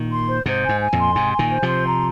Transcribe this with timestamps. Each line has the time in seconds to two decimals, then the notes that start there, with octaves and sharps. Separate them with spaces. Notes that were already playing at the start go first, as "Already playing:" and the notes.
Already playing: A#2 D#3
0.10 C6
0.27 C5
0.45 G#2 C3 C5
0.64 G#5
0.69 G#2
0.81 G#5
0.93 F2 A#2
0.99 C6
1.15 G#2 C3 G#5
1.33 G#5
1.39 A#2 D#3
1.50 C5
1.62 C3 F3
1.68 C6
1.86 A#5